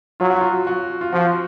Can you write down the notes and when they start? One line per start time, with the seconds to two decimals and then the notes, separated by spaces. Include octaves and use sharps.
0.20 F#3 F4
0.30 F#4
0.41 F4
0.67 F#4
1.01 F4
1.13 F3 F#4